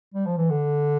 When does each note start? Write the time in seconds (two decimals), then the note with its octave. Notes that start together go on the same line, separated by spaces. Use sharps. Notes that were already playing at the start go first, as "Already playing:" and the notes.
0.14 G3
0.26 F3
0.38 E3
0.50 D3